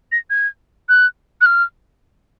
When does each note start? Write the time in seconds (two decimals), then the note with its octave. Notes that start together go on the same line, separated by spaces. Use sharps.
0.12 A#6
0.30 G#6
0.89 F#6
1.41 F#6
1.46 F6